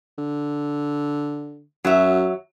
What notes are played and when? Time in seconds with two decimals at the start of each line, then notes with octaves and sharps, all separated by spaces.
0.18 D3
1.85 F#2 F#3 E5